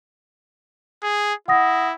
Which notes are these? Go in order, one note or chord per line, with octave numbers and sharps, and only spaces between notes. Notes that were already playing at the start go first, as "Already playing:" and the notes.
G#4
E4 F#5 D#6 A#6